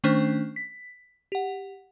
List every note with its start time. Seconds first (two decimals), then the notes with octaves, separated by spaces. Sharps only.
0.04 D#3 A3 C#4 D4 C5
0.56 B6
1.32 G4 F#5